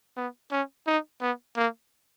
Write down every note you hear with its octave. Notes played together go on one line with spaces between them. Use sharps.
B3
C#4
D#4
B3
A#3